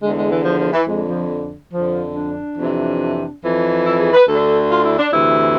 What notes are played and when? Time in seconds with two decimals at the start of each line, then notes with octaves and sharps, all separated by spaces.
0.02 E2 D3 G#3
0.17 G#3
0.31 E3
0.45 F3
0.59 F3
0.73 E3
0.87 F2 D3 G#3
1.09 F3
1.73 F2 D3 F3
2.15 D4
2.58 F2 C3 E3
3.43 F2 E3
3.85 E4
3.99 G#4
4.13 B4
4.27 D2 D3 A4
4.70 F4
4.84 E4
4.98 D4
5.12 D2 C3 E3 E4